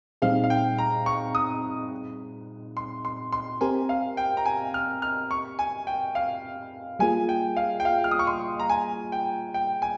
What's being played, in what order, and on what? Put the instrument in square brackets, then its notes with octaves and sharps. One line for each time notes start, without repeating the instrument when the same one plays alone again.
[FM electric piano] A#2 G3 C4 D#4 G#4 [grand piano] F5
[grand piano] F5
G5
A#5
C#6
D#6
C6
C6
C6
[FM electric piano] C4 G4 A#4 [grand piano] G#5
[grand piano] F5
G5
A#5
G#5
F6
F6
C#6
G#5
G5
F5
[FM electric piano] G3 A#3 F4 G#4 [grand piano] G#5
[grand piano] G5
F5
G5
F5
F6
D#6
C#6
C6
A#5
G#5
G5
G5
G#5